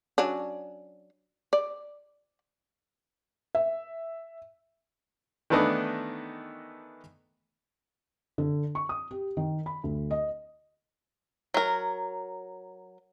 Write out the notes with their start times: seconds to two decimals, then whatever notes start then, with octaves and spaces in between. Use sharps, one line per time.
0.18 F#3 C#4 D4
1.53 D5
3.55 E5
5.50 D#3 E3 A3 B3 D4 D#5
8.38 D3
8.75 C#6
8.89 D#6
9.11 G4
9.37 D#3
9.66 B5
9.84 D2
10.11 D#5
11.54 F#3 A#4